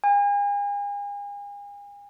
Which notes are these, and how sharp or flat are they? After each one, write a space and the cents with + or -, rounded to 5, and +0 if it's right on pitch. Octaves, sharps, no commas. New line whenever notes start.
G#5 -40